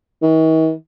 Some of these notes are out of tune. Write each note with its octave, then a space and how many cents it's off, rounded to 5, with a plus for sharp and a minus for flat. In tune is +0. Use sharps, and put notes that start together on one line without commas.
D#3 +45